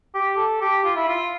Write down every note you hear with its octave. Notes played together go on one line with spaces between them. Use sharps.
G4
A4
G4
F4
E4
F4